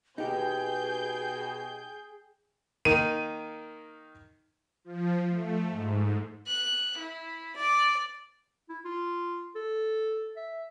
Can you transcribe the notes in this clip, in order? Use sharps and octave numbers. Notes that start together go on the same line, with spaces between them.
B2 D#4 G4 G#4 G5 G#5 G6
D#3 A#3 D#4 D#7
F3
A3
G#2
F#6
E4
D5
E4
F4
A4
E5